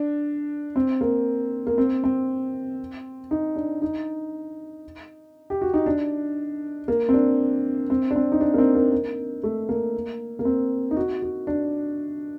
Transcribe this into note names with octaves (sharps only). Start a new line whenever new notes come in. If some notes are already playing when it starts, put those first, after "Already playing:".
Already playing: D4
C4
A#3
A#3
C4
C4
D#4
D4
D#4
G4
F#4
D#4
D4
A#3
C4
D4
C4
D4
C4
D#4
D4
A#3
C4
A#3
A#3
A3
A#3
A#3
C4
D#4
F#4
F#4
D4